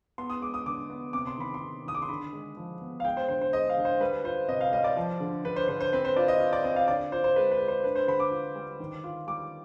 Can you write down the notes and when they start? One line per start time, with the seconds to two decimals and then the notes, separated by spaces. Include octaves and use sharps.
0.18 B3 C6
0.30 D#6
0.41 G#3 D6
0.54 D#6
0.66 D3 D6
0.90 B3
1.13 C3 D6
1.27 C6
1.38 D#3 B5
1.54 C6
1.61 C3
1.86 D#3 D#6
1.95 D6
2.02 C6
2.09 D3 B5
2.33 G#3
2.57 F3
2.81 B3
3.00 F5
3.05 G#3 G5
3.17 C5
3.28 D3 C5
3.41 C5
3.53 G#3 D#5
3.69 F5
3.77 D3
3.85 C5
4.00 G3 B4
4.24 F4 C5
4.49 C3 D#5
4.61 F5
4.73 G3 D#5
4.84 D5
4.97 F3
5.20 D3
5.45 D3 B4
5.56 C5
5.68 D3 C5
5.80 C5
5.93 C4 B4
6.05 C5
6.16 F4 D5
6.28 D#5
6.40 F4
6.53 D5
6.64 C4 D#5
6.76 F5
6.88 D3 D5
7.12 F4 C5
7.24 C5
7.36 G#3 B4
7.51 B4
7.60 G#3
7.68 C5
7.84 D4 B4
7.95 C5
8.08 D3 B5
8.20 D6
8.31 F4
8.56 G3
8.80 D#3
9.04 F4
9.27 G3 D6